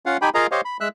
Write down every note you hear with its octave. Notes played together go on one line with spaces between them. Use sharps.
C#4 F4 F5 F#5
D#4 G4 G5 G#5 B5
F4 G#4 A#4 D#5 F5 A#5
G4 C5 C#5 D#5 F5
B5
G#3 E5 E6 F#6